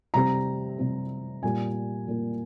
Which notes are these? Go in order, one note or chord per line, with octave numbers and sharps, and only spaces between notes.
C3 G3 C4 A#5
C3 G3 C4
A#2 G3 A#3 G#5
A#2 G3 A#3